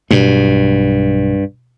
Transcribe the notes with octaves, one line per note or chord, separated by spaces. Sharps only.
B1 G2